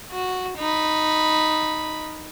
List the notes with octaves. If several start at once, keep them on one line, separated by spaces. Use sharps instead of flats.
F#4
D#4 B5